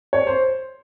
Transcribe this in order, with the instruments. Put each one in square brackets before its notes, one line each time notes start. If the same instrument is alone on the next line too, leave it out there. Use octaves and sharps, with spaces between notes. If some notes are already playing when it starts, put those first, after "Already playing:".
[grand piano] C#5
C5